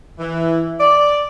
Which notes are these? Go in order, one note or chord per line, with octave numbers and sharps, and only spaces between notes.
E3
D5